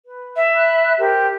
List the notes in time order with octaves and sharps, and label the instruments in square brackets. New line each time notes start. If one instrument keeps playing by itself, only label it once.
[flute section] B4
[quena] E5
[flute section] B5 F#6
G4 A#4 C5